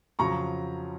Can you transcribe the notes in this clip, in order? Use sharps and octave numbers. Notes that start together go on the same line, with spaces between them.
F2 C#3 F#3 A#5 C#6